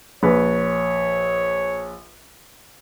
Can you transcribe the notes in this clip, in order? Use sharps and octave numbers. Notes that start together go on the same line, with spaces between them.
A#1 B4 C#5